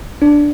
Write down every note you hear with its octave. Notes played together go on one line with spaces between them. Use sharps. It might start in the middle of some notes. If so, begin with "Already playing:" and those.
D4